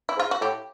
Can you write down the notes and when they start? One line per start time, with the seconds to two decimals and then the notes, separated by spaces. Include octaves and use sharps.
0.09 E4
0.17 G#2
0.19 F4
0.31 F#4
0.41 A2 G4